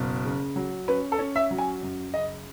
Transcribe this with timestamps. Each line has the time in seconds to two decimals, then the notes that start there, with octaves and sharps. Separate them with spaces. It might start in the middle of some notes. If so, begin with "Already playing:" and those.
Already playing: F#1 B2
0.25 C#3
0.56 F#3
0.88 C#4 B4
1.12 A4
1.19 C#4
1.36 E5
1.51 F#3
1.58 G#5
1.83 F#2
2.14 C#3 D#5